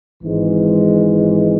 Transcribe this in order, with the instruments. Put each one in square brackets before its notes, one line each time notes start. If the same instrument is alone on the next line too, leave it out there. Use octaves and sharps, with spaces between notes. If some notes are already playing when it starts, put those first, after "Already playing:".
[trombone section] G#1 G#2 E3 G#3